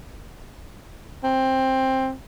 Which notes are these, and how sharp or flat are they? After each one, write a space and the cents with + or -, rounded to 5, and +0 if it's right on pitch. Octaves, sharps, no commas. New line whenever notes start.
C4 +10